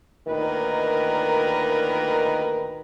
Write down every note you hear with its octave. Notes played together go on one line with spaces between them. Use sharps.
D2 A#2 D#3 D#4 A#4 B4